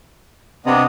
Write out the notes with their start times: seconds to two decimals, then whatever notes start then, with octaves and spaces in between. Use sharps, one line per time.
0.66 C3 B3 D4 D#5